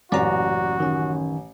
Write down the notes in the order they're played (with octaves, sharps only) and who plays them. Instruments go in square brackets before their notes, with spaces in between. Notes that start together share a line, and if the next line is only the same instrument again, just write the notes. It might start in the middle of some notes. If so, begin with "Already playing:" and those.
[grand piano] A1 [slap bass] F#2 A#2 C#3 [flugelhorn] F#4 [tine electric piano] D5 A#5
[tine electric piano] D#3 C#4